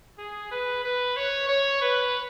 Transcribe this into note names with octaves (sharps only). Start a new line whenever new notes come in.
G#4
B4
B4
C#5
C#5
B4